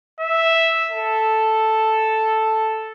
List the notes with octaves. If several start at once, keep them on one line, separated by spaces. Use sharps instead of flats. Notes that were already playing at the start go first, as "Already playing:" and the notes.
E5
A4